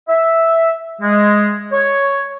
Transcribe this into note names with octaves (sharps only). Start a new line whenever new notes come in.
E5
G#3
C#5